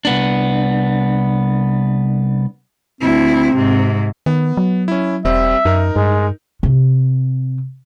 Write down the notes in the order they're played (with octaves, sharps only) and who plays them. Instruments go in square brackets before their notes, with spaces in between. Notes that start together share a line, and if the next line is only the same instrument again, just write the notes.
[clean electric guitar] C2 B3 D4
[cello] D2 E4 [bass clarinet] C4
[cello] G#2 C3
[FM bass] D#3 [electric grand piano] B3
[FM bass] F#3
[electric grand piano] C#4 E4
[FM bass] E1 [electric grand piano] G3 C4 [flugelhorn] E5
[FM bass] F#2 [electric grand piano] D#4 A#4
[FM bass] G2 [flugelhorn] G#3
[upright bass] C3